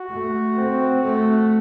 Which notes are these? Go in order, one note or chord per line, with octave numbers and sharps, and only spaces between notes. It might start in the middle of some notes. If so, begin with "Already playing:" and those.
Already playing: F#4
A3
C4
A3